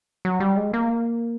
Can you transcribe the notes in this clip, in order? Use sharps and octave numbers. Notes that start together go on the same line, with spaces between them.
F#3
G3
G#3
A#3